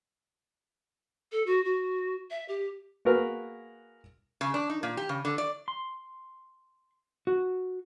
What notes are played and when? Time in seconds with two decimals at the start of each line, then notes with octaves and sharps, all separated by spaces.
1.32 A4
1.46 F#4
1.64 F#4
2.30 E5
2.49 G4
3.05 A#3 F#4 G#4 A#4 B4
4.41 C#3
4.54 D4
4.69 D#4
4.83 A#2
4.97 G4
5.09 C#3
5.25 D3
5.38 D5
5.68 C6
7.27 F#4